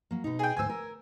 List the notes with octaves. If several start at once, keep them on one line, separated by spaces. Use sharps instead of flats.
F#3 A#3
B2 D#4
G#4 G5
D2 G#2 C5 G#5 E6
A#4